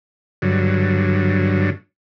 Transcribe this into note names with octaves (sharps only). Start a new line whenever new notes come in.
G2 D3 F#3